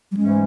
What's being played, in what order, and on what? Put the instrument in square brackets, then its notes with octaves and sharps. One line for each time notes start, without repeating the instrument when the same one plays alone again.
[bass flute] G3
[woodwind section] G#2 E3 A3 C#4 [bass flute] G#3